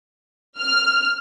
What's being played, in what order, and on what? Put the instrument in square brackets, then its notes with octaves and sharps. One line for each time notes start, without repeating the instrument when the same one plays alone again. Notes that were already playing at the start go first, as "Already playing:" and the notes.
[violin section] F6